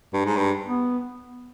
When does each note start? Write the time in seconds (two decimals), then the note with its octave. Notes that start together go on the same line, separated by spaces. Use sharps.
0.13 G2
0.25 G#2
0.37 G2
0.66 B3